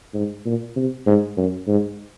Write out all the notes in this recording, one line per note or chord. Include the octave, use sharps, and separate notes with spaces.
G#2
A#2
C3
G#2
F#2
G#2